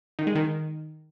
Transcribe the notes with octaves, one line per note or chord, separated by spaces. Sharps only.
D#3
G#3
D#3